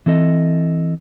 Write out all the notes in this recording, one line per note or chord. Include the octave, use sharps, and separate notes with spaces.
E3 C4 A4 D#5